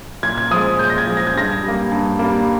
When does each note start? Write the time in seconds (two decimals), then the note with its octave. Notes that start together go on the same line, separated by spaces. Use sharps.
0.23 A#2 G#6
0.38 G#6
0.51 F3 G#3 D#6
0.79 A#2 G6
0.90 A#6
0.98 G#6
1.07 F3 G#3
1.17 A#6
1.27 G#6
1.35 G2 A#6
1.63 G3 A#3
1.92 G2
2.19 G3 A#3